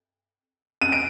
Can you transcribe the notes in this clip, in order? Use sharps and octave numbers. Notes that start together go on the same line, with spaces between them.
D#7
D7